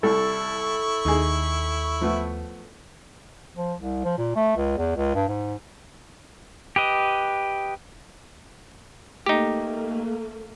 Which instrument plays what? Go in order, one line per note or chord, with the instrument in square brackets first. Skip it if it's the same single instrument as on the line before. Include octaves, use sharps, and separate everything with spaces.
[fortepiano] C2 [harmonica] E4 C#6 [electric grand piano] A4
[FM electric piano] D#2 [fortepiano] D#4 G#4
[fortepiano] F3 A3 B3
[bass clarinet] F3
C2
F3
A#2
A3
C#2
E2
C#2
G2
G#2
[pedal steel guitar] G4 B4 D#5
[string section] A3 A#3 [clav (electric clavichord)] D#4 G4